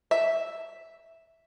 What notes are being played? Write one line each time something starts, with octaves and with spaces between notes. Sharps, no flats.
E5